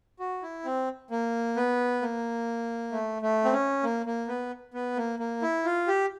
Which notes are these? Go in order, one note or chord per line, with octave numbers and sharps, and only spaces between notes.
F#4
E4
C4
A#3
B3
A#3
A3
A3
C4
C#4
A#3
A#3
B3
B3
A#3
A#3
E4
F4
G4